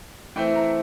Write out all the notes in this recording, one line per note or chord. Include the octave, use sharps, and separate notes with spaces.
E3 A3 C4 E4 G5
A#5